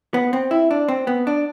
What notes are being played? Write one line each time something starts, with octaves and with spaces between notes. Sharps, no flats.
B3
C4
E4
D4
C4
B3
D4